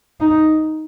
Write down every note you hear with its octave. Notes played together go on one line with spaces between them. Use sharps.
D#4